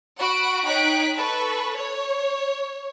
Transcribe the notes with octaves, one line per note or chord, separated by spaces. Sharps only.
F#4 F#5 B5 D7
D#4 C#5 G5 F#6 B6 D7
A4 B4 C#6
C#5